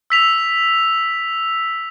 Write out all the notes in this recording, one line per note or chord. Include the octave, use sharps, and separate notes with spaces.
E6 B6 F7